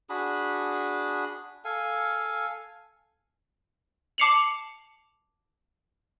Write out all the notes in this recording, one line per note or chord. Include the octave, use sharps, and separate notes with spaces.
D4 F#4 G#4 B5
A4 F5 G#5
A5 D6 C7 C#7 F7 F#7